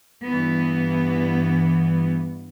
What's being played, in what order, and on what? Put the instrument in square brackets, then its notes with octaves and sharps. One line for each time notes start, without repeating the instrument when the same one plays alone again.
[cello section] G2 E3 B3